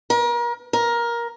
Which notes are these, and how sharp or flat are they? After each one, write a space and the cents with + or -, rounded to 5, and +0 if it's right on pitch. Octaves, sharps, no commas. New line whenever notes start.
A#4 +35
A#4 +15